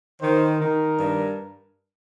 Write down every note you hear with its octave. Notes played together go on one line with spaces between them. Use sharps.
D#3 C5
D#3 A#4
G2